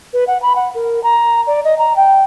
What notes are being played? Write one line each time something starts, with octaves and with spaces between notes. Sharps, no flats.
B4
F#5
B5
F#5
A#4
A#5
D5
D#5
A#5
G5